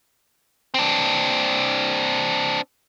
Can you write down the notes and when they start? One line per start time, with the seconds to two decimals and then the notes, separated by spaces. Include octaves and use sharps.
0.74 C4 D4